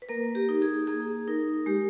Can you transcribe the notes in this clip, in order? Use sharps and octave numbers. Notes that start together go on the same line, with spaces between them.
B4
A#3 A#4
G4
D#4
G#4
A#3 G#4
D#4 A#4
G#3 G4